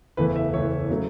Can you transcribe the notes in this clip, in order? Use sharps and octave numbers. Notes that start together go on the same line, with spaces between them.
F#1 E2 E3 A3 B4
E5
F#1 E2 E3 A3 C#5
C#3 F#3 A3